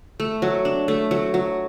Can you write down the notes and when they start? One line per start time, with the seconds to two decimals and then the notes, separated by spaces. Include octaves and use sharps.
0.20 A3
0.42 F#3
0.65 D4
0.88 A3
1.11 F#3
1.34 F#3